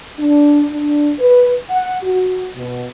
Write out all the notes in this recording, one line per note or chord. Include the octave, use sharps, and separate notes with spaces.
D4
D4
B4
F#5
F#4
B2